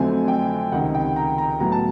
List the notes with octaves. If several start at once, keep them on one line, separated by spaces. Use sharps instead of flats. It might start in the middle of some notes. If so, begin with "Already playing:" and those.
Already playing: F2 D3 F#3 A3 C4 G#5
G5
C#2 C3 D#3 F#5
G5
A#5
A#5
A2 F#3 B3 A#5
A5